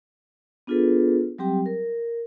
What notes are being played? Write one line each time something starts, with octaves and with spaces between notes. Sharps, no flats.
B3 D4 F4 G#4 A4 B4
F#3 G3 C4 G4 G5
A#4